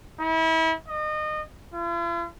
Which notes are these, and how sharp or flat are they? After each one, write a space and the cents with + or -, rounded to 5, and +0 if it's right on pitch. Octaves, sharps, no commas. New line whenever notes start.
E4 -35
D#5 -30
F4 -45